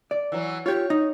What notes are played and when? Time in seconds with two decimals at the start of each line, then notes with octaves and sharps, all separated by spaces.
0.11 D5
0.32 E3 F#3
0.66 F4 G4 C#5
0.90 D#4